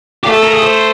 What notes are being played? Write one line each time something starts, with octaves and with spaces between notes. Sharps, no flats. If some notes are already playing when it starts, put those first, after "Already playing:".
A3 G4
A4
A#4
G#4
C5